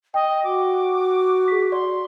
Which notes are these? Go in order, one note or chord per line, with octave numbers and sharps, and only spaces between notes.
D#5 G5
F#4 D6
G#4 B6
D5 C6